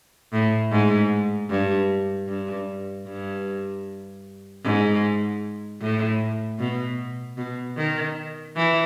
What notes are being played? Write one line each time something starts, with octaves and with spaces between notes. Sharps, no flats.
A2
G#2
G2
G2
G2
G#2
A2
B2
B2
D#3
E3